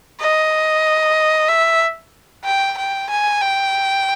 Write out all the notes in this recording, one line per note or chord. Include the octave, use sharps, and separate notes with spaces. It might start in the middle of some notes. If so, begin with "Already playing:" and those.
D#5
E5
G5
G5
G#5
G5